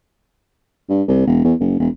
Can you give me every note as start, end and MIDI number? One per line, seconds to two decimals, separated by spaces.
0.89 1.03 43
1.08 1.25 36
1.27 1.40 28
1.44 1.54 40
1.60 1.75 30
1.79 1.88 28